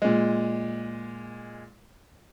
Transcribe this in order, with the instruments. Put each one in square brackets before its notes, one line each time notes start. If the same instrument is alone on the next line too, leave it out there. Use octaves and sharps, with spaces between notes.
[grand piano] A#2 G#3